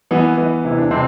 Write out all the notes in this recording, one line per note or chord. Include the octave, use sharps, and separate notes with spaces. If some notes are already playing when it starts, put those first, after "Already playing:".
E3 B3
E3
C3 E4
D4
C3 C4